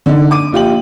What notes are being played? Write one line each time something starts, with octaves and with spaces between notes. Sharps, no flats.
D3 D#4
D6 D#7
A#1 F4 G4 F#7